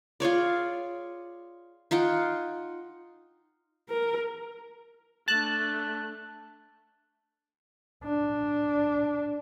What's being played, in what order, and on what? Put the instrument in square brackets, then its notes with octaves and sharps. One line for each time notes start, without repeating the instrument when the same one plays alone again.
[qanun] F4 G#4 C#5 D5
D#4 F4 F#5 G5
[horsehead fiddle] A#4
[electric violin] A3 D4 [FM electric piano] A5 F#6
[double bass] D4